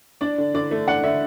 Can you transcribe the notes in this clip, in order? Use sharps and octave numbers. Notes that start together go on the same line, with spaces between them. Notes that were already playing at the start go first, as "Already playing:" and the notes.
D4 D5
D3
D3 D5
A3
D4 F#5
D3 E5